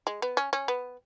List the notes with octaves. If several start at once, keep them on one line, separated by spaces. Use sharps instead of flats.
G#3
B3
C#4
C#4
B3